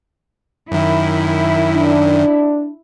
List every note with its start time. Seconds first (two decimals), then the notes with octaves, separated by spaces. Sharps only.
0.71 F#2 D#3 E4
1.74 D4